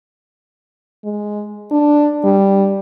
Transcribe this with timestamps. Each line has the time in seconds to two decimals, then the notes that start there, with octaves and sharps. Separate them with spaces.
1.05 G#3
1.72 D4
2.25 G3